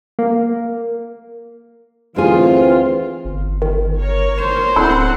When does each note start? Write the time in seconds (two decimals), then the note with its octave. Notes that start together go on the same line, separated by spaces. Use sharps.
0.19 A#3
2.16 D2 E3 C4 F4 G#4
3.25 G1
3.62 D#3
3.98 A#4 C#5
4.39 C5 E7
4.76 D1 C4 D4 E4 A4 F#5